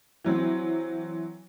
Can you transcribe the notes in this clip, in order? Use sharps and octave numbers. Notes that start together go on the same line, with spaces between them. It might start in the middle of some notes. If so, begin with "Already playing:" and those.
E3 F#3 C4